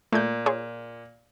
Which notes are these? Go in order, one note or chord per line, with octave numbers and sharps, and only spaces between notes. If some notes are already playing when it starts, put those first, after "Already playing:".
A#2 A3 G6
F4 G#4 C#5